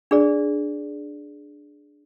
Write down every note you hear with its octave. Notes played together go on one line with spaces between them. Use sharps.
D4 G#4 D5